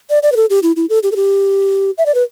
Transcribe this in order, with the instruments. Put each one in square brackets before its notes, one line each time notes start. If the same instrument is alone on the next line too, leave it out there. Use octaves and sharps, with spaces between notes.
[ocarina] D5
D5
B4
A4
G4
E4
E4
A4
G4
A4
G4
E5
D5
B4